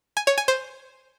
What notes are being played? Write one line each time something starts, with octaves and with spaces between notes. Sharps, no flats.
G#5
C#5
G#5
C5